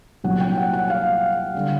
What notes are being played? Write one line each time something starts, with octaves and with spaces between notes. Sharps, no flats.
C2 A#2 F#3 F#5
G5
F#5
F#5
F5
D3 G3